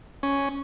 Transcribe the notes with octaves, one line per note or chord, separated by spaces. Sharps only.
C#4